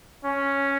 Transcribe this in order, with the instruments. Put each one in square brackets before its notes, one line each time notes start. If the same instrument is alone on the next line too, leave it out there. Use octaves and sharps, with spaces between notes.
[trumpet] C#4